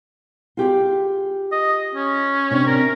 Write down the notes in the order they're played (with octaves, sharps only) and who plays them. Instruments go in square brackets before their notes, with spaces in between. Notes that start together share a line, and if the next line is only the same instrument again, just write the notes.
[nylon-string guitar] F4 G4 G#4
[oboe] D#5
C#4
[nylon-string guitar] C3 D4
[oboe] A#4